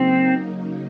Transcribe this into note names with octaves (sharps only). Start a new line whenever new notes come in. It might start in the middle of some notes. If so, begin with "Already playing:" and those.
Already playing: C#3 F#3 A#3 C4 D#4